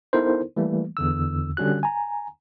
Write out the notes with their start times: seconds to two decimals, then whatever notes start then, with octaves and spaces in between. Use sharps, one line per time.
0.13 B3 D#4 E4 A4 A#4 C5
0.57 E3 G3 A3 A#3
0.97 E2 D3 E6
1.57 D3 G3 C#4 F#4 F#6
1.83 G#5 A#5